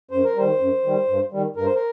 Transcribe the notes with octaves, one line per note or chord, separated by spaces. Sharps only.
F#2 C5
A#4
D#3 G3 C5
F#2
D#3 G3
G2
D#3 G3
G2 A#4
C5
A#4